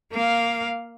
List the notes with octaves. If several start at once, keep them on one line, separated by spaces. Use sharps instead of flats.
A#3 F5